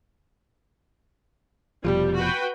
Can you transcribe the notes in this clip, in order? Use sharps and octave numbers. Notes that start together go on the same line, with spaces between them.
F1 B2 F3 G3
F#4 B4 G5